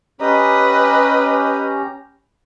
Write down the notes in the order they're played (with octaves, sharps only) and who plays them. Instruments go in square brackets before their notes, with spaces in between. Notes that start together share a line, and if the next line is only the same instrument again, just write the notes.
[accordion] C#4 G4 A#5 [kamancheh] B4 D#5